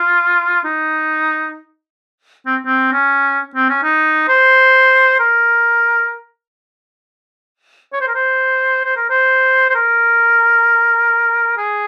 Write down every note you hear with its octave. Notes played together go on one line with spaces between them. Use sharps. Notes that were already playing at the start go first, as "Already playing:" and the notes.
Already playing: F4
D#4
C4
C4
C#4
C4
C#4
D#4
C5
A#4
C#5
C5
A#4
C5
C5
A#4
C5
C5
A#4
G#4